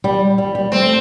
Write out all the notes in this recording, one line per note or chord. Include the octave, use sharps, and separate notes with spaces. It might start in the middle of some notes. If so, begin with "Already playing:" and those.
G3
G3
G3
A3 C4